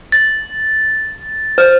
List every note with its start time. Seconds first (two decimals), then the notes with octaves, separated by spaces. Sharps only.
0.12 A6
1.58 C5 F6